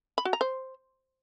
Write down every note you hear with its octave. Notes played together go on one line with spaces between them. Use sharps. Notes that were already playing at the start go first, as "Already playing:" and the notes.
B5
F#4
A#5
C5